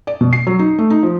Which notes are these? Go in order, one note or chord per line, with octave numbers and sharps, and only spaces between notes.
D5
B2
C7
F#3
D#4
A3
D#4
F3